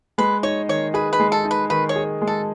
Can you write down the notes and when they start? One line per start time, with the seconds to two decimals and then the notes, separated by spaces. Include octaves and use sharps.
0.18 G#3 B4
0.43 D#4 C#5
0.69 D#3 C#5
0.94 G#4 B4
1.13 B4
1.20 G#3
1.32 A4
1.45 D#4
1.51 B4
1.70 D#3 B4
1.89 C#5
1.96 G#4
2.21 G#3
2.27 A4